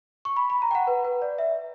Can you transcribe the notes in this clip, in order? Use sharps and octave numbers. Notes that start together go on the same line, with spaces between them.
C#6
B5
B5
A#5
G5
F#5
B4
B4
D5
E5